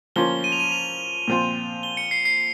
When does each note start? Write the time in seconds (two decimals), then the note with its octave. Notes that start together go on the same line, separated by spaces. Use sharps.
0.16 F3 A#3 C#4 F4 G7
0.44 D#7
0.52 F7
0.60 D#7
0.72 F7
1.28 A#2 F3 C4 F4
1.83 G7
1.97 C#7
2.11 C7
2.25 C7